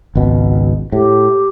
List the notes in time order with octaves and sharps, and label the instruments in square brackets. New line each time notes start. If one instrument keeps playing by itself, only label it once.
[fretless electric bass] G#1 C#2 B2
[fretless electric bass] A2 [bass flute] G4